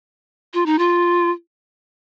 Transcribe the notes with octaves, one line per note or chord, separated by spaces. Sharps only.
F4
D#4
F4